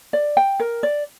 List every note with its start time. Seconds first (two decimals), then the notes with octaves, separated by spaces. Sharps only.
0.13 D5
0.37 G5
0.60 A#4
0.83 D5